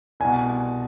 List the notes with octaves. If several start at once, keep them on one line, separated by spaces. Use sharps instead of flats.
C2 B2 G#5